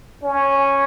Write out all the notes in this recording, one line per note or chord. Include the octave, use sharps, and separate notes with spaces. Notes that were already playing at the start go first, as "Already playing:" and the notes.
C#4